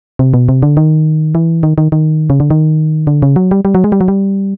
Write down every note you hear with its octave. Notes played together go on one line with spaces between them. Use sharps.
C3
B2
C3
D3
D#3
E3
D#3
D#3
D#3
C#3
D3
D#3
D3
C#3
F#3
G3
G3
F#3
G#3
G3
F#3
G3